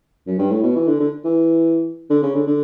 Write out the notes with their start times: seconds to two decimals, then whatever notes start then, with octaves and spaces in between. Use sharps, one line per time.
0.26 F#2
0.39 G2
0.51 A2
0.63 B2
0.76 E3
0.88 D3
1.00 D3
1.25 E3
2.10 D3
2.22 C#3
2.35 D3
2.47 D3